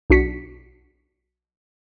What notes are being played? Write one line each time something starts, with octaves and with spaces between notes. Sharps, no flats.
B1 D4 F#4 B6 C#7